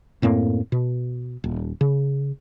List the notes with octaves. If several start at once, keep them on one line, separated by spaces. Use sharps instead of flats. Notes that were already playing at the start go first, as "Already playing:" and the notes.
F#2 A2 A#3 C4
B2
D#1
C#3